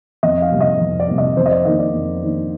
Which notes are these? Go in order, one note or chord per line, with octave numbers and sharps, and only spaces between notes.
F2 D#5
F5
C3 G3 A#3
D#5
F2
D5
C3 G3 A#3
D#5
F2 C5
D#5
D5
D#3 A#3 D4 D#5
D5
F2
D#3 A#3 D4